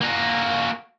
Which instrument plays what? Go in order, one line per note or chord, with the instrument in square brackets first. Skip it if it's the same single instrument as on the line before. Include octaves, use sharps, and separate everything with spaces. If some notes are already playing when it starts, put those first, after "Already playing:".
[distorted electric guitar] A#3 F#4